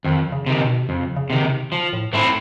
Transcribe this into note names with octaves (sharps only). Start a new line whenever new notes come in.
F2 D#3
C#3
C3 D#3
B2
C3
F2 C#3
C#3
C3 D#3
C3
F3
A2
G#2 A3 C4 E4